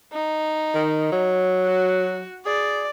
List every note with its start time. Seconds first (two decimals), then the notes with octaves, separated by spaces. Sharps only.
0.13 D#4
0.74 D#3
1.12 F#3
1.64 F#4
2.46 G#4 D5